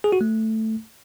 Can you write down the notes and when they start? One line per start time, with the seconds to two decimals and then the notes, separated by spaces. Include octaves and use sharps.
0.04 G#4
0.12 F#4
0.21 A3